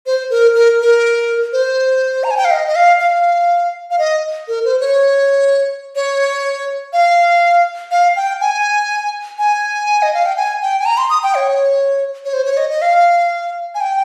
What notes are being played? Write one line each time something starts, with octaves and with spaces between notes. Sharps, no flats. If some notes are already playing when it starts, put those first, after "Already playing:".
C5
A#4
A#4
A#4
C5
A#5
G#5
G5
F5
D#5
D#5
F5
F5
F5
D#5
A#4
C5
C#5
C#5
F5
F5
G5
G#5
G#5
D#5
F5
G5
G#5
G5
G#5
A#5
C6
D#6
G5
C#5
C#5
C5
C#5
D#5
D#5
F5
G#5
G5